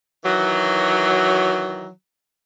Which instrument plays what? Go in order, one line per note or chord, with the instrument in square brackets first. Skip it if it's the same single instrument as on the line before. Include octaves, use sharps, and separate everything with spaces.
[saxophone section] D#3 E3 F#3